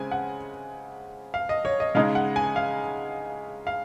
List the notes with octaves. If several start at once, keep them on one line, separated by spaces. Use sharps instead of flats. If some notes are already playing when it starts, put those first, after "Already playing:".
Already playing: C#3 G#3 C4 G#5
F#5
F5
D#5
C#5
D#5
C#3 G#3 D#4 F5
F#5
G#5
F5
F5